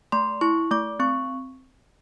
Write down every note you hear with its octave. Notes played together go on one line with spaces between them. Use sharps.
A3 C6
E4 C#6
A3 D6
C4 C#6